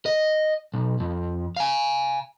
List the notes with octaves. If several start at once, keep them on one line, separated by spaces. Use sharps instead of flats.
D#5
B1
F2
F5 G#5